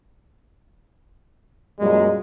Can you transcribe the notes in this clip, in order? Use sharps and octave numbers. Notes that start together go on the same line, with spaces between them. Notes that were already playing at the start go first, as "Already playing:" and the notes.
F#2 A#2 G3 G#3